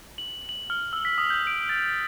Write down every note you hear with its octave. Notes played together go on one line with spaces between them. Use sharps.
F#7
F#7
F6
E6
B6
D#6
G6
D7
A6